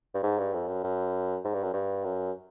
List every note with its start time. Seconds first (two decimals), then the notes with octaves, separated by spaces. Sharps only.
0.14 G2
0.23 G#2
0.38 G2
0.54 F2
0.68 F#2
0.84 F#2
1.45 G#2
1.54 G2
1.63 F#2
1.74 G2
2.04 F#2